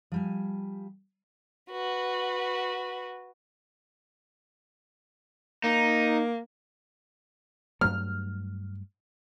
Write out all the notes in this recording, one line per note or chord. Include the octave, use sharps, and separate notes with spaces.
F3 G3 G#5
F#4 B4
A#3 D#4
G2 F#3 A3 F6